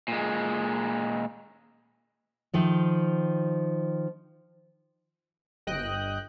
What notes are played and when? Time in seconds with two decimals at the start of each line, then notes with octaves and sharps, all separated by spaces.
0.08 A#2 G#3
2.54 D#3 F3 A3
5.67 G1 D#5 G5 F#6